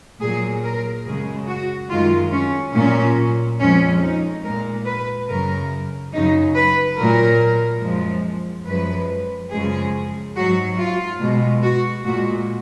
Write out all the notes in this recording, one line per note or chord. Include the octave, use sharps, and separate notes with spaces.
A#2 F#3 G#4
A#4
F#2 C#3 G#3 G#4
F#4
F#2 D#3 G#3 F4
C#4
A#2 F#3 C#4
F2 F3 G#3 C#4
D#4
A#2 G#3 A#4
B4
F#2 C#3 F#3 A#4
F#2 C#3 F#3 D#4
B4
A#2 F#3 A#4
F#2 F3 G#3
F#2 F3 G#3 B4
F#2 C#3 F3 G#3 G#4
G#2 F#3 F#4
F4
B2 G#3
F#4
A#2 G#3 F#4